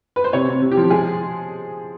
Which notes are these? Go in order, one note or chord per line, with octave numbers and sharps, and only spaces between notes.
B4
C5
C3 C#5
C3
C3
G4
F3
G#3 G#4